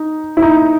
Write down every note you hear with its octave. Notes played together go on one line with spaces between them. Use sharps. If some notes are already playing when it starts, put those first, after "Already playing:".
Already playing: D#4
E4
D#4